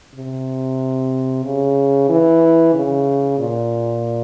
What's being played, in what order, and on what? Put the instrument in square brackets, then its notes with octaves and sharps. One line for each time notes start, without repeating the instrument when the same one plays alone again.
[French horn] C3
C#3
E3
C#3
A#2